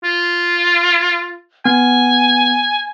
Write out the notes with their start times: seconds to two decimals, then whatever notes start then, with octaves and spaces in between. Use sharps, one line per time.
0.04 F4
1.65 B3 G#5